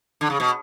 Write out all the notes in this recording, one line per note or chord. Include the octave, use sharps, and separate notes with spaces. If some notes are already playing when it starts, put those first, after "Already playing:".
D3
C#3
B2